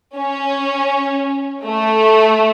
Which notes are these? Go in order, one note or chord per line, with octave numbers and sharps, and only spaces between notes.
C#4
A3